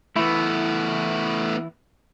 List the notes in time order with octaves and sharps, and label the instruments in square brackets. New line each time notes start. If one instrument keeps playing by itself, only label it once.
[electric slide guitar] E3 E4 [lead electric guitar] A3 B3